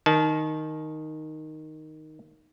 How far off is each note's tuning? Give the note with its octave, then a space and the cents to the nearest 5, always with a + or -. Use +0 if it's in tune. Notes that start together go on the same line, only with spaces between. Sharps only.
D#3 +0 A5 -35